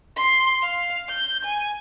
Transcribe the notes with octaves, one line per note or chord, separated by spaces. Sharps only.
C6
F5
G6
G#5